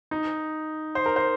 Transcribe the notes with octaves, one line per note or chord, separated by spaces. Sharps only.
D#4
C5
A#4
C5